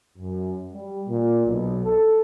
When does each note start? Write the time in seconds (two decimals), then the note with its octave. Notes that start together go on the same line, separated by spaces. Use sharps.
0.18 F#2
0.73 G3
1.08 A#2
1.46 B1
1.84 A4